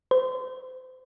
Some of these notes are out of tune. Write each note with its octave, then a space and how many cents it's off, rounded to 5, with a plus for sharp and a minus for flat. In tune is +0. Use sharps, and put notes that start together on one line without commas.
C5 -30